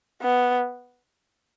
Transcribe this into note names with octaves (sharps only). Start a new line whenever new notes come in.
B3